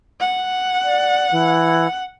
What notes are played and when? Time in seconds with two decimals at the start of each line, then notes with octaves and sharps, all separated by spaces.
0.21 F#5
0.84 D5
1.32 E3